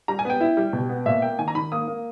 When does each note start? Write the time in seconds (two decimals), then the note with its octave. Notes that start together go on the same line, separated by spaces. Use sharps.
0.08 G3 A#5
0.19 G#5
0.25 B3 G5
0.41 E4
0.57 G3
0.73 B2
0.89 B3
1.06 A#2 E5
1.22 A#3 G5
1.39 D#3 G#5
1.48 A#5
1.55 D#3 B5
1.72 A#3 D#6
1.87 A#3